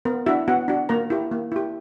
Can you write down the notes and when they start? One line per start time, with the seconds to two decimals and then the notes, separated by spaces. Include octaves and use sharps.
0.05 B3 A#4
0.26 D4 E4 F#4 E5
0.48 B3 F#4 F#5
0.68 D4 F#4
0.89 A#3 A#4 A#5
1.10 E4 G4
1.31 A#3
1.52 E4 G4